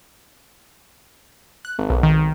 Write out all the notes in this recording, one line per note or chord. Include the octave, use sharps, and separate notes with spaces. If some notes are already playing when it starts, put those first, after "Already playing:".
F#6
G#1
B1
D#3